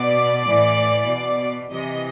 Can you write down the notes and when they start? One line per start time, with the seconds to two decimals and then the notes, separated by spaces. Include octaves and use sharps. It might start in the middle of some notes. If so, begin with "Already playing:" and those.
Already playing: B2 D5
0.44 A2 E3
1.07 B2
1.70 C3 E3 D#5